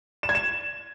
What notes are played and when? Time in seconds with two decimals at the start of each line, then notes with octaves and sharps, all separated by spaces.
0.23 E7
0.29 G#6
0.35 E7